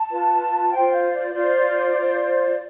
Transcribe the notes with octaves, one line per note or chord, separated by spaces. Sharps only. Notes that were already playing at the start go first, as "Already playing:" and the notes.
Already playing: A5
F4 B4
F4 C5 G5
F5
D5
F4 C5
F4 C5